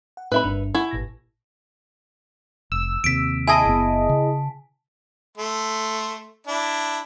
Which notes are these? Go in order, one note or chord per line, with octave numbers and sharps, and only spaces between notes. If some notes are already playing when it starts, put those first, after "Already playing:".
F#5
A2 C4 D#4 B4 E5 B5
G1 G2 D4
E4 F#5 G#5 C#6
G#1 A#2 A#6
F1 E6
D#2 C3 B6 D7
E4 G#4 D#5 G#5 A5
F#1 B3
C#3
A3 C6
D4 E4